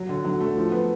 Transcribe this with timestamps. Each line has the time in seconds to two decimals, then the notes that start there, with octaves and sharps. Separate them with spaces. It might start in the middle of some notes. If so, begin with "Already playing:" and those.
Already playing: F#3
0.09 D3
0.24 F#3
0.41 A3
0.57 F3
0.72 B3